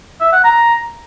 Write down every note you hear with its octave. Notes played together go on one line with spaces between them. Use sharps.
E5
F#5
A#5